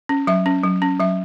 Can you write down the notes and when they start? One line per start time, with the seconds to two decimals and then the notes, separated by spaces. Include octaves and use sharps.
0.09 C#4
0.27 F#3 E5
0.46 C#4
0.64 F#3
0.82 C#4
1.00 F#3 E5